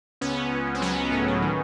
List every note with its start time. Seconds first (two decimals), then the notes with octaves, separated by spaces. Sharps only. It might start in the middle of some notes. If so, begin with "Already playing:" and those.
0.21 C#2 B3 C#4
0.37 C#2
0.51 C#2
0.66 C#2
0.74 C4
0.81 F#3 B3 C#4
0.97 F#3
1.11 A2
1.28 F#3
1.42 D#3